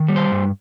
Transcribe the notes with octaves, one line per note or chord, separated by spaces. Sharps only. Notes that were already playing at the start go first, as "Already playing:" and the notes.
Already playing: D#3
G3
C5
G2